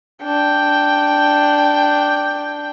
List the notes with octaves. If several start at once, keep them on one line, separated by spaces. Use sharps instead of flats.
D4 G5